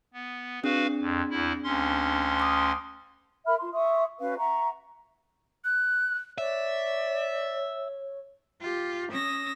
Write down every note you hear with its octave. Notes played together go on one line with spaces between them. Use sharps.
B3
C4 D4 F#4 G#4 B4 F5
F2
E2 E4
D2 C#4 C6
D6 D#6
A#4 E5 B5 F6
F4 C6
E5 C6 C#6 D#6
C#4 F#4 B4 F5
E5 F#5 A#5 C#6
F#6
C#5 D5 E5
F4 G4
C#4 D#6 E6 A#6